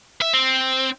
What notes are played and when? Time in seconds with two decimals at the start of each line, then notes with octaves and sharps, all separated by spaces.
0.22 E5
0.34 C4